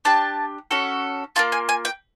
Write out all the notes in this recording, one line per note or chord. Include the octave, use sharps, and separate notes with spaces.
D4 G4 A5
C#4 F#4 A4
A#3 D4 F4 A5
G#5
G#5
G5